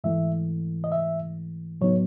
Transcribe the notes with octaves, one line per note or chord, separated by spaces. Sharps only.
G#2 E3 A3 E5
D#5
E5
A2 F#3 B3 D#4 C#5